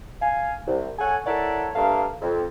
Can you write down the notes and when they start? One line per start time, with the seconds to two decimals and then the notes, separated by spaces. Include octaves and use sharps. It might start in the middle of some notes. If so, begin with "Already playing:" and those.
0.21 F5 G#5
0.66 C2
0.99 A4 C#5 F#5 G#5
1.26 E4 A4 A#4 C#5 D5 F#5
1.75 G2 A#3 A4 E5 F5
2.21 F2